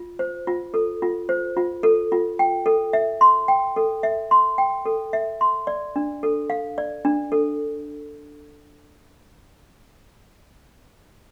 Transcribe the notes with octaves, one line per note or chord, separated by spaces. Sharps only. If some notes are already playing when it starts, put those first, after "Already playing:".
Already playing: F4
C5
F4
A4
F4
C5
F4
A4
F4
G5
A4
E5
C6
G5
A4
E5
C6
G5
A4
E5
C6
D5
D4
A4
F5
D5
D4
A4